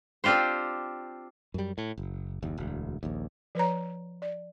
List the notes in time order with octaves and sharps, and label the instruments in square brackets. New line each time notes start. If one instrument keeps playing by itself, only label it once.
[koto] C4 D4 F4 G4 C5
[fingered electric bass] F#2 G3
A2
F#1
F#1 D#2
E1 D2
A#1 D#2
[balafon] F3 B4 C#5 A#5
D5